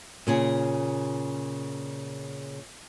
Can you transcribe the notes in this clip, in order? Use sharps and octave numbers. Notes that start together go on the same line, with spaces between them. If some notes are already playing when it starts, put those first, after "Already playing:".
A#2 C#3 G#4